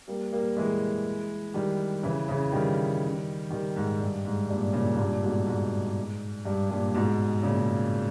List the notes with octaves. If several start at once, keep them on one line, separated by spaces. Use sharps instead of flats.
G3 A#3
G3 A#3
E3 G#3
D#3 G3
C#3 E3
C#3 E3
D#3 G3
D#3 G3
G#2
G2
G#2
G2 A#2
A#2 C#3
G#2
G2 A#2
G#2 B2
G#2
G2
G2 A#2
G#2 B2
A#2 C#3